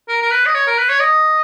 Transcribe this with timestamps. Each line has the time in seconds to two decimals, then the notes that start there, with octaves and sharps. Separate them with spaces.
0.08 A#4
0.22 A#4
0.31 B4
0.46 D#5
0.55 C#5
0.67 A#4
0.78 B4
0.89 C#5
1.00 D#5